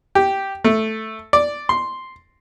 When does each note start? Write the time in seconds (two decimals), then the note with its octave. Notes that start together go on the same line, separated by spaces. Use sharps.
0.15 G4
0.64 A3
1.33 D5
1.69 C6